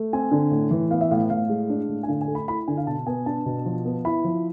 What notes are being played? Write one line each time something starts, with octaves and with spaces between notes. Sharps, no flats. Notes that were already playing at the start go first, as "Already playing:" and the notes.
Already playing: A3
C4 G#5
D3
A2
E3
B3 F5
E5
A2 F5
A2 F5
G#3
D4
A2
G#5
D3 F5
G#5
A3
B5
E4 B5
D3 G#5
F5
B2 A5
B3 G#5
D4 A5
B2
F3
B3
E4 B5
F3